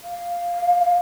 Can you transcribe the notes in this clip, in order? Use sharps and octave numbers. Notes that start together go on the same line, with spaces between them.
F5